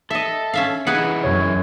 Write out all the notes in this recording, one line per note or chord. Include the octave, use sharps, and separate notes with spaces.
A4 D#5 E5
C#4 E5 F5
E3 D#4 E4 G#4 B4 F#5
F#2 C#5